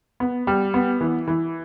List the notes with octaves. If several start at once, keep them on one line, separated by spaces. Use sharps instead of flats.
B3
G3
B3
E3
E3